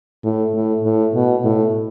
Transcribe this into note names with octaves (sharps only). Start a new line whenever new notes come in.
A2
A2
A2
B2
A2